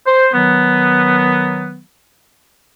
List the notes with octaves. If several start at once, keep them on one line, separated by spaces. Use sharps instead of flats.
C5
D#3 F#3 B3